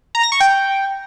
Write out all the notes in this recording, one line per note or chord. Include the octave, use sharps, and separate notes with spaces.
A#5
A#6
C#6
G5